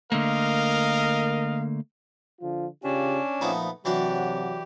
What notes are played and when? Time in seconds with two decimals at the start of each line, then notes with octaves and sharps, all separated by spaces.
0.12 D3 A3 A#3 A#4 D#5 F5
2.41 D3 F3 F4
2.84 C#3 C#4 D4 F4 G4
3.41 A#2 F3 A3 B3 D#4
3.85 C3 E3 F#3 D4 F#4 G4